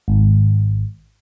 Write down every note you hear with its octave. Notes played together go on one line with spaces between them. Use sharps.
G#1